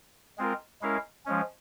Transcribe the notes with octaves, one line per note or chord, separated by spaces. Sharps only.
G#3 C4 F4 A#4
G#3 C#4 E4 A#4 F5
F3 G#3 C#4